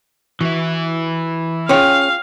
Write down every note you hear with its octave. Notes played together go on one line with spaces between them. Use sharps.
E3 E4 F#4
C#4 F4 G#4 C#5 F5 G5